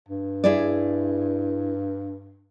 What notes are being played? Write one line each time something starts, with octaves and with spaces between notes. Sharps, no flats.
G2
E4 G#4 D5